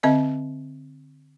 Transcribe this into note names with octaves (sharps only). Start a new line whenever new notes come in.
D3 C4 D#5 E5